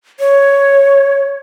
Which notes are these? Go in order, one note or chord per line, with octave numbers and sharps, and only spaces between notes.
C#5